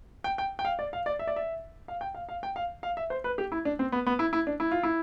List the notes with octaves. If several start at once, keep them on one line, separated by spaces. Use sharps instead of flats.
G5
G5
G5
F5
D5
F5
D5
E5
D5
E5
F5
G5
F5
F5
G5
F5
F5
E5
C5
B4
G4
E4
D4
C4
B3
B3
E4
E4
D4
E4
F4
E4